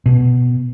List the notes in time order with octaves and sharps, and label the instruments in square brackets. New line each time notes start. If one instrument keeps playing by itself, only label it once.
[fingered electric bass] B2